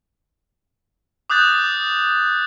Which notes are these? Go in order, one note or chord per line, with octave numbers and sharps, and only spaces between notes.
D6 D#6 F#6 G6 A6